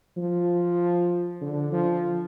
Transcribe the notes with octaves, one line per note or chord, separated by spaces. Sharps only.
F3
D3
F3